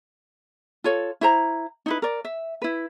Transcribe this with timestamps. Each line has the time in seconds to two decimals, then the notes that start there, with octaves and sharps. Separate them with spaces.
0.84 F4 A4 C#5
1.21 E4 C5 A#5
1.86 D#4 E4 B4
2.02 A#4 D5
2.25 E5
2.62 E4 B4